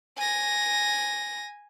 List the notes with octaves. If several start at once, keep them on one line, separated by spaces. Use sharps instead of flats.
G#5 A#6